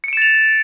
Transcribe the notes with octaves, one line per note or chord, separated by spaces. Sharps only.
A6 C#7 D7 E7 F7